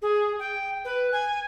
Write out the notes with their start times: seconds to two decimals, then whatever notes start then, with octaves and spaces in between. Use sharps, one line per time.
0.02 G#4
0.39 G5
0.85 B4
1.12 G#5